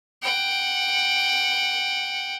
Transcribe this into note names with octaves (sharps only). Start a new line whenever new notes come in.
F#5 G5